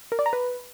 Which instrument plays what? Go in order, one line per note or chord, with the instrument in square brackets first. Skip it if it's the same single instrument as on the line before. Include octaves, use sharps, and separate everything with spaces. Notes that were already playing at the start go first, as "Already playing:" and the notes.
[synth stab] A#4
D5
A#5
B4